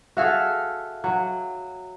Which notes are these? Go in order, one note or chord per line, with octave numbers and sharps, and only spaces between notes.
F#4 G#4 A4 E5 F5 F6
F#3